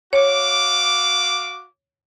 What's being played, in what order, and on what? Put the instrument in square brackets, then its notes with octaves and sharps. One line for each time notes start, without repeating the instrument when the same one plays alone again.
[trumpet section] F#4 F5 D6 [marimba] C#5